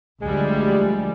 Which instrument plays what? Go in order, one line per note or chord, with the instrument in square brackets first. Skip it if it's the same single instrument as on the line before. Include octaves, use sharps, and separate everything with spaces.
[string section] D2 F3 G3 [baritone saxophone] G#3